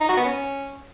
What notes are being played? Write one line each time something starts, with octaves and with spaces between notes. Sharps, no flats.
D#4
F#4
B3
C#4